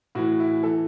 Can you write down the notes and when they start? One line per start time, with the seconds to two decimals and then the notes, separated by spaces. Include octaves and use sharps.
0.15 A2 E3 F#4
0.40 E4
0.63 E3 A4